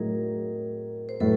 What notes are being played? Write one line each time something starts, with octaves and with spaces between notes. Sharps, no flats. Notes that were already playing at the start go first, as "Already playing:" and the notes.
Already playing: A2 F#3 D#4 G#4 A#4
C5
A2 F#3 A4 B4